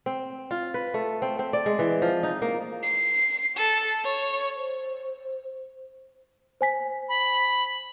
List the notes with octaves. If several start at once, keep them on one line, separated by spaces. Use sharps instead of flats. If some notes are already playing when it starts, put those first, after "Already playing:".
C4
F4
B4
A3
C4
C4
D5
G#3
E3
F3
D#4
A#3
C7
A4
C#5
C5
C5 G#5 B6
B5